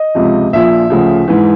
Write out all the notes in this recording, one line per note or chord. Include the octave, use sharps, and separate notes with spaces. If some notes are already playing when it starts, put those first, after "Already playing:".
Already playing: D#5
C#2 C3 F3
A#1 A#2 F3 E5
D2 C#3 F3
G#2 E3